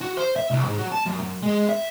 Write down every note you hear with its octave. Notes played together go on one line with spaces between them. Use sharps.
F#4
C5
E5
C2
G#2
F#3
A5
F#2
F#2
G#3
E5